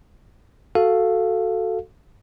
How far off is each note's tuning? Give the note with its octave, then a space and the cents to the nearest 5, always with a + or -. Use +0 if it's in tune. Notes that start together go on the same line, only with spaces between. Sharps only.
F#4 +0 A4 +0 F5 +0